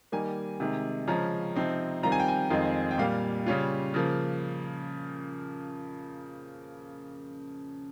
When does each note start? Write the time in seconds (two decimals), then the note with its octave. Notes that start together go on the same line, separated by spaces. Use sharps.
0.12 D#3 G3 A#3 G#5
0.60 C3 D#3 G#3
1.08 C#3 F3 G#3 C#4 A#5
1.56 C3 F3 C4 D#4
2.03 D#3 G3 C4 F4 A#5
2.12 G#5
2.20 G5
2.28 G#5
2.50 F2 D#3 G#3 C4 F4
2.91 G5
2.98 A#2 G3 A#3 F5
3.46 C#3 G3 C#4 F4
3.94 C#3 F3 A#3